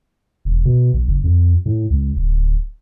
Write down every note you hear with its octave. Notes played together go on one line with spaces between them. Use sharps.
E1
B2
A#1
F#1
F2
A2
C#2
D1